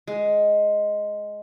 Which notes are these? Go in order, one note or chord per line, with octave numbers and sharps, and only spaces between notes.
G#3